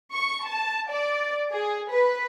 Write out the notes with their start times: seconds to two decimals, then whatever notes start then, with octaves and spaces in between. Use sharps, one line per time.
0.11 C#6
0.44 A5
0.91 D5
1.53 G#4
1.91 B4